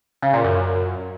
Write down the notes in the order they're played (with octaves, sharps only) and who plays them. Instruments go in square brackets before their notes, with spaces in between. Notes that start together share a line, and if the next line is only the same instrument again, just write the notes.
[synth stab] C#3
A#2
F#2